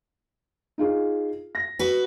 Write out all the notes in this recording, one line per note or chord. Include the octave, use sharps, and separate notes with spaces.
D#4 F4 G#4
A#6
F#4 B4